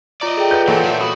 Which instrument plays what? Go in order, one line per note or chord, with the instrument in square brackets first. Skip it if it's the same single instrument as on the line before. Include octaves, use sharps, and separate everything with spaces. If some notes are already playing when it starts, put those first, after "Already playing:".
[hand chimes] F4 A#5 D6 [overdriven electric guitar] D5 D#5
[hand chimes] G#4 A4 G5
[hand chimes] F4 B4 F#5 [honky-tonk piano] G6
[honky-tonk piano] A#2 A4 [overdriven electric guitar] E3 [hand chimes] C#5
[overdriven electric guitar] G#4 E5
[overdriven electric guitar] F#4 [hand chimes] B5 D#6